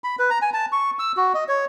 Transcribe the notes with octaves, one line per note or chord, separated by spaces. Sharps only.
B5
B4
A#5
G#5
A5
C#6
E6
F#4
D#5
C#5